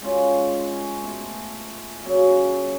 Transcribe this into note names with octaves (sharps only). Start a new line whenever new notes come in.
G#3 C#4 F4
A3 B3
C#3 F#3 A#3 G#4